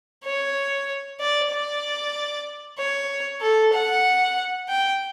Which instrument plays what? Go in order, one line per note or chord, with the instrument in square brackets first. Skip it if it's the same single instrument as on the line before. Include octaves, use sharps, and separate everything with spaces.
[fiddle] C#5
D5
D5
C#5
A4
F#5
G5